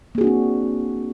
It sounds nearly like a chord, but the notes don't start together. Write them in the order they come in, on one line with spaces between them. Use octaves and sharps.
A#3 G#4 F#4 D4 C4